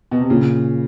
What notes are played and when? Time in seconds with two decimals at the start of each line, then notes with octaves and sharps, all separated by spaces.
0.11 B2
0.20 C3
0.30 A#2 C#3